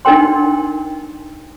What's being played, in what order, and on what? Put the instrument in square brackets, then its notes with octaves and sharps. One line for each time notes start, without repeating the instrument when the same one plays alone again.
[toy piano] D4 D#4 A#4 F#5 G5 C6